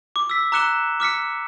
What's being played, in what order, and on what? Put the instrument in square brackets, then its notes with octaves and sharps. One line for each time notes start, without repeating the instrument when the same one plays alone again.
[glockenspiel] D6
E6 B6
A#5 D6 F#6 C#7 E7 G7
D6 F6 B6 C#7